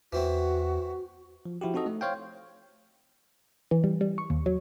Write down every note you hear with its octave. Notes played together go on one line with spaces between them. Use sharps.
E2 E3 C4 E4 F#4
F3
F3 E4 F#4 G4
C4 D#4 F#4 A4 D#5
A3
C5 C#5 F5 G5
E3
G3
G3
C#6
D#2
F#3